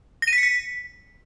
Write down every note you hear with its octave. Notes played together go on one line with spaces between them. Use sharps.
A#6
D#7
B6
C#7
B6